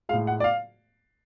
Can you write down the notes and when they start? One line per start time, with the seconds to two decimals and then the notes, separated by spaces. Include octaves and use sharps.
0.09 G#3 F5
0.13 A2
0.27 F#5
0.40 D5
0.44 F5